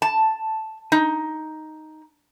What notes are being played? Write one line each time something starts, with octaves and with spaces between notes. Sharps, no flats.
A5
D#4